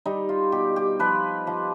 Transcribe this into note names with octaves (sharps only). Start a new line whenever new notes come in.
G3 D#4
F4
B2 G4
G4
F3 B4
F3